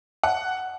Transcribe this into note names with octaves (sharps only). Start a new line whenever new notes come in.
F#5